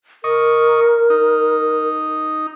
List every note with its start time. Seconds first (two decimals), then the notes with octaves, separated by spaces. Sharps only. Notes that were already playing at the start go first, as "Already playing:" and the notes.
0.24 A#4 D#5 C#6
1.10 D#4